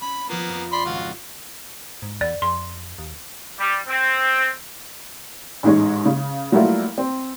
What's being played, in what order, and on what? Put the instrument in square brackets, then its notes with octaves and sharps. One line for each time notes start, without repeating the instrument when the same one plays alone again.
[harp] C#4 [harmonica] B5
[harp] F3 F4 [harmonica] A#3 B3
[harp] F2
[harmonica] D5 B5 C6
[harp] G#1 C#2 [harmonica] F4 F#4
[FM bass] G#2
[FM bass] E2 [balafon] D5
[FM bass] F2 [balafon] C6
[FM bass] D#2
[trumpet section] G3
C4
[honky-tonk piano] A1 G#2 G#3 C#5
C#3
F#3 G3 A3 A#3 E4 F4
C4